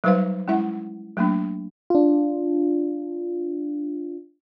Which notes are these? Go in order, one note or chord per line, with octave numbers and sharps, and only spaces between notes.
F#3 G3 D#4 B4 C5 F5
G#3 C#4 E4 E5 F#5
F#3 A3 A#3 D4
D4 F4